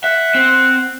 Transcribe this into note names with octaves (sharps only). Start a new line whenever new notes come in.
E5 F#5
C4